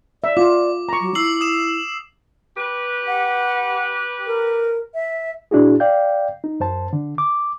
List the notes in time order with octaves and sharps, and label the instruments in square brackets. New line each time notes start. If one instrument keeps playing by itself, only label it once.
[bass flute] D5 [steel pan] E5
[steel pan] F4 [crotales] D6
[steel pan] A#5 C#6
[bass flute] F#3
[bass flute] E4 [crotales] E6 C7 F#7
[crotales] D#6 E7
[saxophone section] G4 B4
[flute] F#5
A#4
E5
[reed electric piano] A#2 D4 E4 F#4 G#4
D5 F5 G5 G6
D#4
F#2 C5 A5
D3
D6